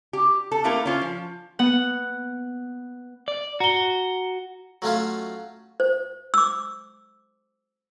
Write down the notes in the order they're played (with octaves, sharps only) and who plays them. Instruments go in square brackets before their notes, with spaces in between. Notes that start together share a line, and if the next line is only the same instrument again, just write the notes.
[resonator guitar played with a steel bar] G4
A4
A3 A#3 E4 G4 A4 A#4
C#4 F4 C5
F3
[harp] B3 F#5
[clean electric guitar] D5
[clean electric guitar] F#4 [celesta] A#5 G7
[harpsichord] F#3 A3 C#4 F4
[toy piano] C5
D6 E6